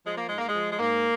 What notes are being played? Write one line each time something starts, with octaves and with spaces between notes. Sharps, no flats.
F3 G#3
A#3
G#2 G#3
A#3
G#3
F3
G#3
G#2 A#3